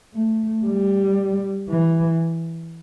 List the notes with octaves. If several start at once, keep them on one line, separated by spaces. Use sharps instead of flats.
A3
G3
E3